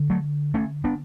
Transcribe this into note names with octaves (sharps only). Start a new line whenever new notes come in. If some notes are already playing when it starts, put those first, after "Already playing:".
Already playing: D3
F#3 A3
A3 C#4
B3 D4